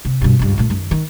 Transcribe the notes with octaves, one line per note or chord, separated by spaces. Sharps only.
C3
G2 B2
C#2 G2
A#2 A3
F#2 D#3
D#3